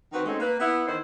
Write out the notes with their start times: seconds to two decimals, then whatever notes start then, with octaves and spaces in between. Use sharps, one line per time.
0.12 D#3 C4 F#4 B4
0.26 G#3 A3 C4 C#4 D#4
0.40 A#3 B4
0.60 B3 E4
0.86 E2 D#3 E4 C5